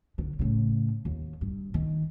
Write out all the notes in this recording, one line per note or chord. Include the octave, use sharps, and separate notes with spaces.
D3
A2 C#3
D#2
G2
D#3